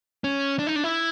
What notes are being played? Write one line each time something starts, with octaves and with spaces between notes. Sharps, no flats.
C#4
D4
D#4
D4
E4